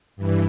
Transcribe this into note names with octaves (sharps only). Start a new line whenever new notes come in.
G2 E3